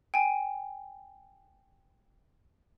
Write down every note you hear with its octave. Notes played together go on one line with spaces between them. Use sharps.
G5 G#5